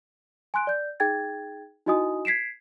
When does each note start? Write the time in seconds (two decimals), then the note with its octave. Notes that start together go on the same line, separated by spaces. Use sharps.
0.54 G#5 C6 F#6 D7
0.67 D5 G6
1.00 D#4 G#4 G5 G#6 A6
1.87 D#4 E4 F#4 D#5 G#5 D#6
2.25 G#6 B6 C7 D7 E7